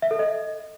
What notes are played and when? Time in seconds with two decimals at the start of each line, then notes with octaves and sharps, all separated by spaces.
0.02 E5
0.11 A4
0.19 D#5